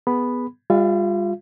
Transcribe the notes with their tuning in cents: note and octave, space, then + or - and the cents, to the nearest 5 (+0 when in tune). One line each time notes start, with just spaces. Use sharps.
B3 +0 G#4 +0 B5 +0
G3 +40 F4 +20 F5 -45